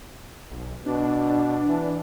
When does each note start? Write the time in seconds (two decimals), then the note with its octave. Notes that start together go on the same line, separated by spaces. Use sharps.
0.51 B1
0.86 B2 D4
1.67 E3